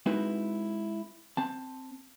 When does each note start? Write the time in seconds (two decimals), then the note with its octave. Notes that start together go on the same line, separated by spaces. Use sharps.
0.06 G#3 C4 D#4 E4 F#4 B4
1.37 C4 A5